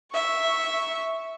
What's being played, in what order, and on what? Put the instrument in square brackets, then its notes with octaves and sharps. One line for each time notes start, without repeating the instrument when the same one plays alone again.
[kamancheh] E5 C#6